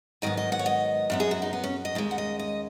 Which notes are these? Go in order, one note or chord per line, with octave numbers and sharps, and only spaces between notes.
G#2 D#3 F#3 B3 D#5
D#5
F#5
C#5
D#5
F#2 F#3 B3
G#4
F#4
D#4
B3
C#4
D#5
D#2 C#3 G#3
F#5
D#5
D#5